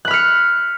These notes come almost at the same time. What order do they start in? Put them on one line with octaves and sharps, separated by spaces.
F#6 B5 F6 C#7